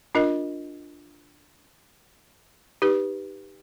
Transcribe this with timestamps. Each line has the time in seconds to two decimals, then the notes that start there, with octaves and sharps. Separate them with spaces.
0.15 D4 F4 A#4 D#5
2.82 D#4 G4 B4